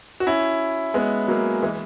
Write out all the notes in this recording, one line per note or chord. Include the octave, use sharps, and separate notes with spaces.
F#4
C#4 E4
G#3 B3
F#3 A#3
E3 G#3